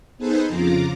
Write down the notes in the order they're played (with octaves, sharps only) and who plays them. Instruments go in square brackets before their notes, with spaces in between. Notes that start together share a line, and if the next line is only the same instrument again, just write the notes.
[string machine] B3 D#4 G#4 A4 B4 C5
F2 C#3 F4 A#5 D6